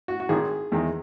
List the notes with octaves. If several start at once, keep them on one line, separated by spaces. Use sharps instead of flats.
F#4
F#4
G#1 G#2 D#3 G#3 G#4
E2 D#3 G#3